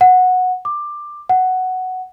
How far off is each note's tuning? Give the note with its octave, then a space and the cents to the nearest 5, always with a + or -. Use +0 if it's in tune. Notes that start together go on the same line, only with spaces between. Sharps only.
F#5 -10
D6 +15
F#5 +5